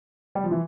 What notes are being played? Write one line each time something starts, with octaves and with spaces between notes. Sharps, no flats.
G3
F3
E3